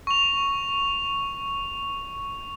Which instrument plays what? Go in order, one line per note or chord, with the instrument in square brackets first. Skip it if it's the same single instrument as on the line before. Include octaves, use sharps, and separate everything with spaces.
[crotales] C#6 F7